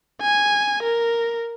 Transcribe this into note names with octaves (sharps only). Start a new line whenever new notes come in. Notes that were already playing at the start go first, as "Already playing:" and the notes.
G#5
A#4